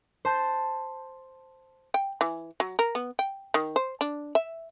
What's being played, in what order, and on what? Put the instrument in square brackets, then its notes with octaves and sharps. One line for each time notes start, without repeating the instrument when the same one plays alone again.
[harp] C5 A5 G6
[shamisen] G5
E3
F#3
A#4
B3
G5
D#3
C5
D4
E5